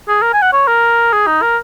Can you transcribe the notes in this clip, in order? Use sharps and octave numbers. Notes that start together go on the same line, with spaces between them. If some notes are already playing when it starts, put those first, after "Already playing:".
G#4
A#4
G#5
F#5
C#5
A#4
G#4
D#4
A#4